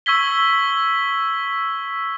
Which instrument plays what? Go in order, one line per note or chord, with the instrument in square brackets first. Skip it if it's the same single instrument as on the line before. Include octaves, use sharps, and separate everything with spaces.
[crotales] C#6 E6 G#6 B6 G7